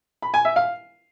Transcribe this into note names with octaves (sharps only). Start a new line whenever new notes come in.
B5
G#5
E5
F5